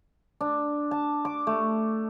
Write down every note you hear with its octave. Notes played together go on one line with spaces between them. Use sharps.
D4
A5
D6
A3